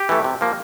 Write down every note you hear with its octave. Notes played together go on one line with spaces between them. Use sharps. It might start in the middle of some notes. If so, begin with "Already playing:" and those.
Already playing: G4
E3 A3
C3
F3 A#3